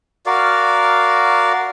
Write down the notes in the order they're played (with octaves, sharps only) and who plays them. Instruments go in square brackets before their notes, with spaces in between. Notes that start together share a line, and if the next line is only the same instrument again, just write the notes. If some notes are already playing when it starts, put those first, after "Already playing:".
[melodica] F#4 A#4 D5 F5